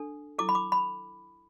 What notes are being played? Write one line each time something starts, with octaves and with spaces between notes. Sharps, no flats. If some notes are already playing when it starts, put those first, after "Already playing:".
Already playing: D4 A4
E4 A4 D6
B5
D6
B5